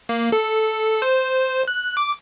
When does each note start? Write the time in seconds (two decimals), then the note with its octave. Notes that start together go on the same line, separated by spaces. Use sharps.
0.09 A#3
0.32 A4
1.02 C5
1.68 F#6
1.97 D6